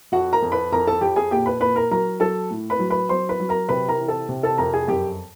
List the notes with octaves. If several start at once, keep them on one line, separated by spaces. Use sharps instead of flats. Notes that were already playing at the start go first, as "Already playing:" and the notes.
F2 F#4 F#5
A#4 A#5
F2
B4 B5
F2 A#4 A#5
A4 A5
F2 G4 G5
G#4 G#5
A#2 G4 G5
B4 B5
A#2 B4 B5
A#4 A#5
F#3 A#4 A#5
F#3 A4 A5
A2
B4 B5
F#3
B4 B5
F#3 C5 C6
B4 B5
F#3
A#4 A#5
C3 B4 B5
A#4 A#5
E3
A4 A5
C3
A4 A5
F2 A#4 A#5
G#4 G#5
F#2 G4 G5